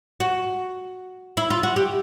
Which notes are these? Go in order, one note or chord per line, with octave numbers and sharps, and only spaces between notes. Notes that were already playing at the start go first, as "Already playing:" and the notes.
F#4
E4
F4
F#4
G4